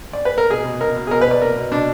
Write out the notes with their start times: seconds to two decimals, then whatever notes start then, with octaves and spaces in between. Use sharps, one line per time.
0.13 D5
0.25 B4
0.38 A#4
0.50 B2 G#4
0.65 B2
0.80 B2 A#4
0.96 B2
1.07 G#4
1.11 B2 A#4
1.21 B4
1.27 B2 D5
1.42 B2 A#4
1.56 B2
1.72 B2 D4